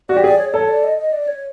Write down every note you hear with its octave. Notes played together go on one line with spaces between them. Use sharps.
F#4 D5
G4
G#4 D5
C#5
D5
A4 C#5
D5
D#5
D#5
D5
C#5